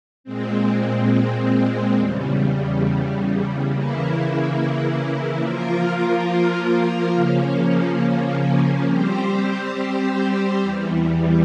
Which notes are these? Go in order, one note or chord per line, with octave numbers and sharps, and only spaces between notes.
A#2 G#3 C4
E2 C#3 G3
C#3 E3 A#3 E4
F3 A#3 F4 A#4
C#3 F3 A#3 C#4
G3 C4 G4 C5
E2 E3 G3